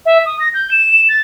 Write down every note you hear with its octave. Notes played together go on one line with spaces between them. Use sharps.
E5
D#6
A#6
G6
E7
A6